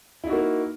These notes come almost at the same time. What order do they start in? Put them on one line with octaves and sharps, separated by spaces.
E4 D#4 F#4 A#3